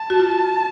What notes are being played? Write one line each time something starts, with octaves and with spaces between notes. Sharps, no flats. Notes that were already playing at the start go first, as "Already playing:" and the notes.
Already playing: A5
F#4
F4